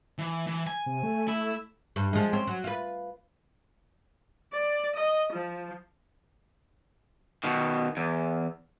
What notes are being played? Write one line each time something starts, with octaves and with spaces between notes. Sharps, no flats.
E3
E3
G#5
C3
A3
E4
G2
F3 G#3
C4 C#4
F#3
F4 B4
D5
D#5
F3
B2 D#3
E2